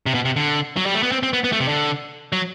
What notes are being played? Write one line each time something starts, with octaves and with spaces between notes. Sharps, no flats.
C3
B2
C3
D3
F#3
G3
A3
B3
C4
C4
B3
B3
A3
C3
D3
F#3